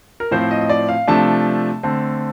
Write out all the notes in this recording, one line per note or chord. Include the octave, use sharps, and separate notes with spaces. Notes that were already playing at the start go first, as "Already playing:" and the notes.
A#4
A2 F3 C4 C5
D#5
D#5
D5
F5
C3 F3 A3 D4 A5
D3 A3 C4